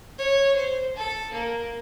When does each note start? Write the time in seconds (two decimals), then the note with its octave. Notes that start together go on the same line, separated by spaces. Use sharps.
0.18 C#5
0.56 C5
0.96 A4
1.33 A#3